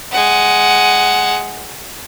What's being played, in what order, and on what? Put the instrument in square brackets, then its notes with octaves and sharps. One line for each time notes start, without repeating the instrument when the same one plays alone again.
[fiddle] G#3 F#5